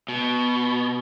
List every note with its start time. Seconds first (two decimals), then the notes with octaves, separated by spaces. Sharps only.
0.08 B2